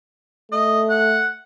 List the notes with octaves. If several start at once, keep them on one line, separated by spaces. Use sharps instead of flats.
A3 D#5
F#5